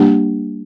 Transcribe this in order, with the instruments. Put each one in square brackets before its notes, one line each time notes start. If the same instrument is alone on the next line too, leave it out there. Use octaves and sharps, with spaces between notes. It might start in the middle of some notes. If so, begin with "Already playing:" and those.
Already playing: [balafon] G3 A#3 D4 G4